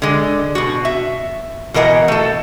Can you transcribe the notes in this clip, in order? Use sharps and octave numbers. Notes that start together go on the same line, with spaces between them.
D3 G#3
B2 F#4
E5
B2 E3 A#4 D#5 F#5
A3 A4